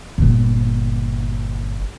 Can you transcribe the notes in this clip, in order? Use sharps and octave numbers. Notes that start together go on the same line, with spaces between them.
G1 A#2